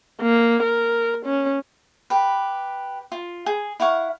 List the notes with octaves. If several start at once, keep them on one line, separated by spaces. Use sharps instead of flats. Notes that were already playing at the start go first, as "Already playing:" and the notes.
A#3
A#4
C#4
G4 B4
F4
G#4
E4 F5 F#5 C#6